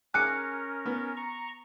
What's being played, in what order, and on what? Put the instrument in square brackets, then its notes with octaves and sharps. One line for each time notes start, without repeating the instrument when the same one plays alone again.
[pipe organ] C#4 A#4 [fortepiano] G#4 G#5 D6 [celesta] F#6 C#7
[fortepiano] B3
[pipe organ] A#5 C#6